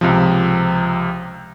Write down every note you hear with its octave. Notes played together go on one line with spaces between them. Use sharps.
C#2 C3 F3